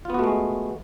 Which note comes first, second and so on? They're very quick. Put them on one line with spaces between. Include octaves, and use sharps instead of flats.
F4 B3 F#4 A3 G#3